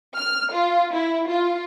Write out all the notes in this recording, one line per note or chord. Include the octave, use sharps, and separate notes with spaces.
F6
F4
E4
F4